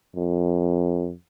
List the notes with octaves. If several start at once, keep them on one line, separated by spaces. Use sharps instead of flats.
F2